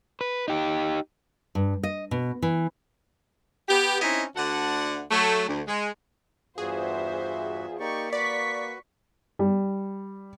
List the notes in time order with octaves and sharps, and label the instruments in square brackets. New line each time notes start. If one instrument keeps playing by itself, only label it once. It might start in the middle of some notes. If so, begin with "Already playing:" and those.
[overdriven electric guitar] B4
D#4 G4
[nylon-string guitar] G2
D#5
B2
E3
[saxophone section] B3 G4
C4 C#4 D#4 E4 D#5
D2 D3 F#4 A4 F#5
F#3 A3
D2
G#3
[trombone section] E2 F4 [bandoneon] G2 F#4 [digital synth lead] G#4 [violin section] C5 E5
[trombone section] A#3 [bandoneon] D#4 G4 D5 [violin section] C#6
[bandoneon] F#4 B4 [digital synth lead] D5 [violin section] C#6 B6
[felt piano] G3